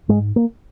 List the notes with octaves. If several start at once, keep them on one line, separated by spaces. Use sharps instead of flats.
G#2 G#3
A#3